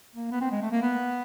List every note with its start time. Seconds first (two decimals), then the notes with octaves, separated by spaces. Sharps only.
0.15 A#3
0.31 B3
0.41 C4
0.52 G#3
0.61 A3
0.71 A#3
0.82 B3